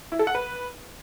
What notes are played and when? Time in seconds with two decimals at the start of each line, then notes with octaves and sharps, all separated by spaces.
0.12 E4
0.19 A4
0.27 F#5
0.35 B4